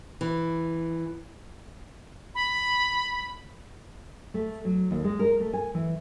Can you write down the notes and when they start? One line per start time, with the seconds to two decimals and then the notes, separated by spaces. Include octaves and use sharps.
0.21 E3
2.35 B5
4.34 A3
4.65 F#3
4.91 D#2
5.04 G#3
5.19 A#4
5.40 A3
5.53 G#5
5.74 E3